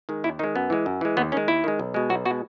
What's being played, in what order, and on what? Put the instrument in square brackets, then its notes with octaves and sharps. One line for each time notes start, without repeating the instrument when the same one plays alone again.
[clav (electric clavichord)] D#3 G#3
D#2 E4
D#3 G#3 D#4
F#2 B3
E3 G#3
F#2
E3 G#3
D#2 B3
D#3 G#3 C#4
D#2 E4
D#3 G#3
B1
B2 G#3
B1 F#4
B2 F#4
G#3